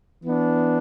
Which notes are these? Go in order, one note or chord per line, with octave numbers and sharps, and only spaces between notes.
E3 B3 D4